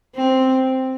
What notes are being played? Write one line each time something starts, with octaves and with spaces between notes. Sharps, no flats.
C4